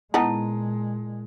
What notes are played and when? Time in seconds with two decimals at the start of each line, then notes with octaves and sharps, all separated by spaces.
0.14 A#2 G#3 B3 D#4 E4 A5 B5